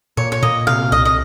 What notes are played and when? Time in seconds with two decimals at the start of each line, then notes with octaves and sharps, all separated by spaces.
0.17 A#2 C#5
0.32 C#5
0.43 A#2 D#5
0.67 C3 F5
0.92 C2 D#5
1.05 D#5